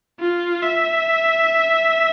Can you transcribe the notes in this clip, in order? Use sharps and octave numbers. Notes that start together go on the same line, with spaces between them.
F4
E5